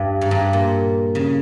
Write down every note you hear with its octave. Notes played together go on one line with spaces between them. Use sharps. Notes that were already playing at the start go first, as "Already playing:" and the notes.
Already playing: G2
G#2
G2
A#2
C#3